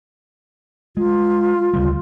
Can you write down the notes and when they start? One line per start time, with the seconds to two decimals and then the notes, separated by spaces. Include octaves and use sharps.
0.97 G#3 F4
1.73 D2 C#3 G3